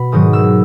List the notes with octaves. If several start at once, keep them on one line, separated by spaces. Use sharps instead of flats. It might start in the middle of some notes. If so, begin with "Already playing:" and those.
Already playing: B2 B5
G#2 D#3 F#3 D#6
E6